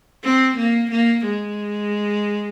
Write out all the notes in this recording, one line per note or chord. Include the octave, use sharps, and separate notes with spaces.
C4
A#3
A#3
G#3